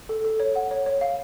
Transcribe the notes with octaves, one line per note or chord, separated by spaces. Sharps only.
A4
A4
C#5
F#5
C#5
C#5
F5